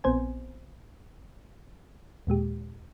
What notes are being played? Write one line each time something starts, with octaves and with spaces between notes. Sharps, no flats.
A#1 B3 C4 C5 G#5
D#2 A#2 G#3 G4